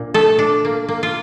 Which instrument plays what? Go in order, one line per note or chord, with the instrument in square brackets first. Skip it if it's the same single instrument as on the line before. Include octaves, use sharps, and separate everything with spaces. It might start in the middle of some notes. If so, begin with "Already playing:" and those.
Already playing: [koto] A#2 D4
A3 A4
D4
A#3
A#3
F4